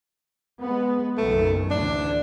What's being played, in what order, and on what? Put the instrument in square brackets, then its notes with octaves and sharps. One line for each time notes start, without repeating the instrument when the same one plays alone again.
[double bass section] G#3 B3
[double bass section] F#1 B1 D#3 [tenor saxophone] A3
[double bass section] A1 D2 [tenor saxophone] D4